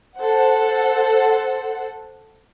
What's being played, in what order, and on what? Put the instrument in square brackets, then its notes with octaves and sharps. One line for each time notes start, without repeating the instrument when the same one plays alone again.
[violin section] A4 C5 F#5